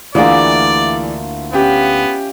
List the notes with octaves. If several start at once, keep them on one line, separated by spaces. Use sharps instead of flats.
D2 E3 A#3 D4 E4 F4 G#4 D5
B3 C#4 G4